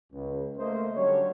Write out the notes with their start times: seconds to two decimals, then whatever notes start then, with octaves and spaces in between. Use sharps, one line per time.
0.13 C#2
0.57 A3 A#3 C5 D#5
0.95 D3 F#3 G3 C#4 C#5